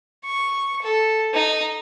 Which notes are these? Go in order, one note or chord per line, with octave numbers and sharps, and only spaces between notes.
C#6
A4
D#4